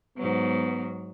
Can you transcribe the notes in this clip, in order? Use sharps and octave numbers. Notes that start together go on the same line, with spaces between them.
G#2 F#3 B3